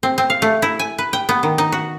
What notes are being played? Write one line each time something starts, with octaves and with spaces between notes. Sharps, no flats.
C4
C4
F5
A3
E4
G#5
B4
G5
B3
D#3
D#4
F#4